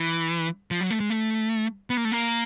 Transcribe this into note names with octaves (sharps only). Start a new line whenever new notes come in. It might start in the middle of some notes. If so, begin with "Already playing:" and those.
Already playing: E3
F3
F#3
A3
G#3
A3
B3
A#3
A3
A#3